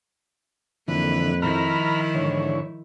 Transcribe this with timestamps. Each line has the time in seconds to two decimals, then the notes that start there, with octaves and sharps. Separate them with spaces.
0.88 F2 D3 E3 A#3 B4
1.42 D#3 F3 E4 A#5 B5 F6
2.15 G#2 D3 E3 C#5